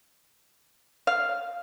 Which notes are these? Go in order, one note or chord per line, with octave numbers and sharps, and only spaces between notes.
F5